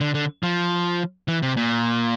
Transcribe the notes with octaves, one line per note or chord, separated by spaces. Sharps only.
D3
D3
F3
E3
C3
A#2